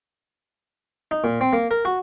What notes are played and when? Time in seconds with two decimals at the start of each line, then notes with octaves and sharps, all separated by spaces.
1.11 D#4
1.24 A#2
1.41 C4
1.53 A#3
1.71 A#4
1.85 F#4